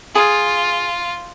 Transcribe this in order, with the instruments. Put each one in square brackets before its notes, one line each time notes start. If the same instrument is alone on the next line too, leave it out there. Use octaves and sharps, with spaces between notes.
[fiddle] F4 [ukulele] G#4